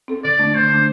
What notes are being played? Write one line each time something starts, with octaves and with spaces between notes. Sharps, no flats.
C4 A4
D3 D5
A3 D4
D3 C5
A3 D4